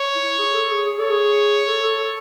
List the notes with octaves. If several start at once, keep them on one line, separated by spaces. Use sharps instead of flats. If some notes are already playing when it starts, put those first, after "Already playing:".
Already playing: C#5
E4
G#4
A4
G#4
G#4
A4 C#5
G#4
A4
A4
A4